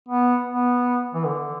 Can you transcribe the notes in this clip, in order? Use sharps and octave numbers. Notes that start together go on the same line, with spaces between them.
B3
B3
E3
D3